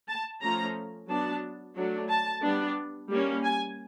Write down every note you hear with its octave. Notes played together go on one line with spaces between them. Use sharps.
A5
F3 A3 C#4 A#5
F#3 B3 D4 A5
F#3 A3 D4
A5
G3 B3 D4
G3 A#3 C#4
G#5